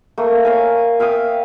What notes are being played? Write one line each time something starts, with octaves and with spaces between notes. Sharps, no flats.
A3 A#3
C#5 F5 G#5
E5 F5 G5 D#6